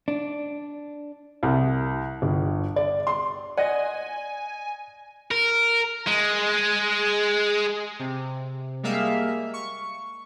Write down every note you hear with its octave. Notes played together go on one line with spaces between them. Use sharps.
D4
C2
G1
D5
C6
D5 D#5 F#5 G#5
A#4
G#3
C3
G3 G#3 A#3 E5 F5
C#6